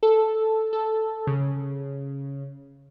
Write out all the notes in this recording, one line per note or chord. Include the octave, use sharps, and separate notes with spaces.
A4
A4
C#3